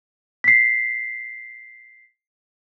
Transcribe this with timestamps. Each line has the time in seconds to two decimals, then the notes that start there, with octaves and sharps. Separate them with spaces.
0.44 B6 C7